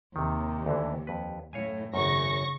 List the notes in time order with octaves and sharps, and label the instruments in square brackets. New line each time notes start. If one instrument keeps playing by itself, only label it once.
[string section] D#2 [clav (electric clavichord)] C3 D#3
[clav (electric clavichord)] D2 D3 E3
F2 B4
[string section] F#2 A2 [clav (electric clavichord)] C#5 F5 G#5
[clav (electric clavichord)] G#1 F#2 [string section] C#3 C#6 A#6